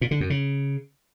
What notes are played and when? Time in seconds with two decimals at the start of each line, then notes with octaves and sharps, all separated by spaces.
0.01 A#2
0.11 D3
0.20 F#2
0.30 C#3